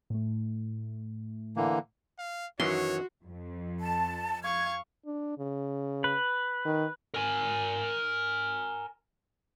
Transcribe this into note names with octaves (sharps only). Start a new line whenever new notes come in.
A2 A3
D3 E3 A#3
F5
F#2 D#3 E3 F#4 C#5 C6
F2
A5
F5 C#6 G#6
D4
C#3
B4
D#3
A#4 G#5